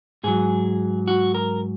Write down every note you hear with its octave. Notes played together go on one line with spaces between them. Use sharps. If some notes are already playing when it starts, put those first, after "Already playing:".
G#2 F#3 G#4
F#4
A#4